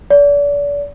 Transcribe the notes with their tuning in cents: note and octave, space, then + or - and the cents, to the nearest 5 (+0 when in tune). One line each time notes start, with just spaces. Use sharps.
D5 -35